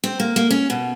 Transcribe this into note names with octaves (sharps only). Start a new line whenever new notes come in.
C4
A#3
A#3
C#4
B2